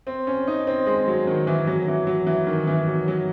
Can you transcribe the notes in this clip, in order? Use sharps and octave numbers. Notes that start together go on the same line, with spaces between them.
C4
C#4
D#4
C4
G#3
F#3
D#3
E3
F#3
E3
F#3
E3
D#3
E3
F#3
F#3